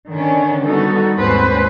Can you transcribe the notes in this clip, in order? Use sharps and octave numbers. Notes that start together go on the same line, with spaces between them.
D3 D#3 C#4 D4
G3 B3 D#4 F#4 A4
D#2 G#2 C4 C#4 B4 C5